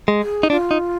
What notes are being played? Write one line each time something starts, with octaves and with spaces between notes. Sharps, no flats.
G#3
G#4
D#4
D4 F4
D#4